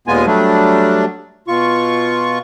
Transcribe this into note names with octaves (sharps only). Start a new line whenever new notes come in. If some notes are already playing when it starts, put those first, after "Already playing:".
D#2 A#2 G#3 B3 F4 G#5
F#3 G3 A3 D4
B2 F4 C#6